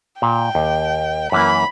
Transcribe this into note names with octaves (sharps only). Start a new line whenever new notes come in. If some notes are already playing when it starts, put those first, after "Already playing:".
A#2 G5
D#2
F#2 E3 A#3 B5